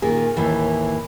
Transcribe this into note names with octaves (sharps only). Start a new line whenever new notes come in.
A#2 D#3 G#4
D#2 A2 E3